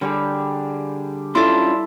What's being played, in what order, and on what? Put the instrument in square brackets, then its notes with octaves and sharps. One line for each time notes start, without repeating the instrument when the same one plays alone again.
[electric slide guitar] D3 [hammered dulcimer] G3 G4 G#4
[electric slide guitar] C#4 D4 F4 [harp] E4 A4 [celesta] C6